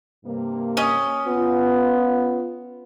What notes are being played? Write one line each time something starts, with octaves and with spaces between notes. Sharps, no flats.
G2 C3 A#3
C#4 D#5
B3 F4